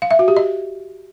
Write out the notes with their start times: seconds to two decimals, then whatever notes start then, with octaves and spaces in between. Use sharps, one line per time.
0.02 F5
0.11 E5
0.19 F#4
0.28 G4
0.37 D#5